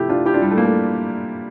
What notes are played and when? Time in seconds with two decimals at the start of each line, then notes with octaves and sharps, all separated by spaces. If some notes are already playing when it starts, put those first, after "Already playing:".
Already playing: C3 F3 A3 E4 G4
0.09 D4 F4
0.26 E4 G4
0.34 D4 F4
0.42 G3
0.51 A3
0.58 A#3
0.64 A3